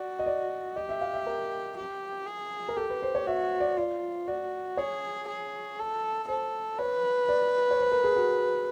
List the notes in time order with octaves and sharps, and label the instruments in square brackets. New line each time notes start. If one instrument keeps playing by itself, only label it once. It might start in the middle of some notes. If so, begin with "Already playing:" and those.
Already playing: [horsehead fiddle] F#4 [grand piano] D5
[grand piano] D#5
D5
[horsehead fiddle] G4 [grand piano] D#5
[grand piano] E5
F5
E5
A#4
[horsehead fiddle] G4
G#4
[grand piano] A#4
[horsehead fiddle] G4 [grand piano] A4
[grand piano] B4
C5
C#5
[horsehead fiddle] F#4 [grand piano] E5
[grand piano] D5
[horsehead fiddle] F4 [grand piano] D5
[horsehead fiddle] F#4 [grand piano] D5
[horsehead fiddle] G#4 [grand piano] C#5
[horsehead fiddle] G#4
A4
[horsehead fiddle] A4 [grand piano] C5
[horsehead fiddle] B4 [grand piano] C#5
[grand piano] D5
C#5
C5
A#4
G#4
F#4